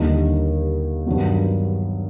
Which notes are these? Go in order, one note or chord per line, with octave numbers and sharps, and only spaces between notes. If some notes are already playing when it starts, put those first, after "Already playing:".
Already playing: D#2 D3 G3 A#3 D#4
G2 D#3 F#3 B3